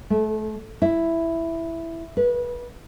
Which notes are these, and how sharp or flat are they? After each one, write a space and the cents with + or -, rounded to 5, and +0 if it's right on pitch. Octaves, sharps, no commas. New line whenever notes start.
A3 -30
E4 +5
B4 -25